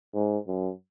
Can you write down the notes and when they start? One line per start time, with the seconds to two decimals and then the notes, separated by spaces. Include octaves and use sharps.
0.14 G#2
0.47 F#2